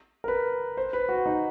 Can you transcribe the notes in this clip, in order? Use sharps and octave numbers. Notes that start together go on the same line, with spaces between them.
A#4
B4
C5
B4
F#4
D#4